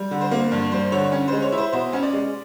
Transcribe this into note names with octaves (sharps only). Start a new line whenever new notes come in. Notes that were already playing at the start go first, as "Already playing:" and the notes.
Already playing: G3
D3
C5
A#3
G2
G3 C5
D3 C#5
C#4
G#3 C5
C#5
E4
C5
B2 C5
C#4
D5
G#3